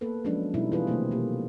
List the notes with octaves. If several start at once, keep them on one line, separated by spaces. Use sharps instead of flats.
A#3 B3 A4 B4
F3 F#3 G#3 C#4 D4
B2 F#3 G3 D#4 E4
E3 E4 F4 G#4 A4 B4
C3 D#3 F#3 A3 A#3 C4
B2 A#3 G4